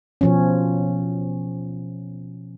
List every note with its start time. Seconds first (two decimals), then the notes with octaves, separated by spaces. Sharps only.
0.21 B2 F3 C#4